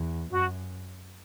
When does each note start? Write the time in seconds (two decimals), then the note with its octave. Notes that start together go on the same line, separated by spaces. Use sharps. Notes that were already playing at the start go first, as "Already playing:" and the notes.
Already playing: E2
0.31 F#2 F#4